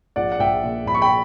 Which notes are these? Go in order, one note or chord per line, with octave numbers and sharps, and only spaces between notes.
A#1 D5 F#5
F#5
A#1 E5 G5
A#2
A#1 B5
C#6
G5 B5